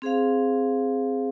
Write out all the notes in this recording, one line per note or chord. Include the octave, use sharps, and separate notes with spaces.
C4 G#4 C5 F5